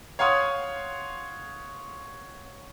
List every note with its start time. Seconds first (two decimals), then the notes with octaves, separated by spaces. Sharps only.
0.19 C#5 F5 F#5 C6 D#6